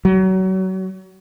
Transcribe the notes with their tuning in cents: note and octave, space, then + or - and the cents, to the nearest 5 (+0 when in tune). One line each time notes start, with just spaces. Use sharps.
F#3 +30